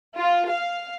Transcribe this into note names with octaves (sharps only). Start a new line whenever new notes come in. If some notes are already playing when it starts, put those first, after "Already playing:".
F4
F5